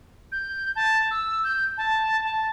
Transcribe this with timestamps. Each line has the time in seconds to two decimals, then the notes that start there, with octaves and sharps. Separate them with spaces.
0.32 G6
0.76 A5
1.11 E6
1.44 G6
1.77 A5
2.23 A5